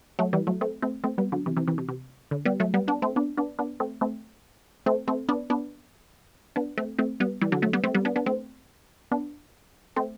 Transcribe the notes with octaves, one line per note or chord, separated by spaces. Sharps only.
F#3 A3
E3 G3
F#3 A3
A3 C4
A3 C4
A3 C4
G3 B3
D3 F#3
C3 E3
C3 E3
C3 E3
C3
C3
D3
G3 B3
F#3 A3
G3 B3
B3 D4
A3 C4
B3 D4
B3 D4
B3 D4
A3 C4
A3 C4
A3 C4
A3 C4
B3 D4
B3 D4
B3 D4
A3 C4
A3 C4
G3 B3
E3 G3
D3 F#3
F#3 A3
G3 B3
A3 C4
G3 B3
B3 D4
B3 D4
A3 C4
B3 D4
A3 C4